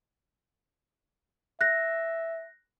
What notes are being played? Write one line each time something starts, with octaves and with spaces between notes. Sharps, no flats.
E5 F#6 A#6